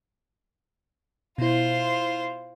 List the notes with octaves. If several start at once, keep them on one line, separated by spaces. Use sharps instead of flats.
B2 E4 F4 C5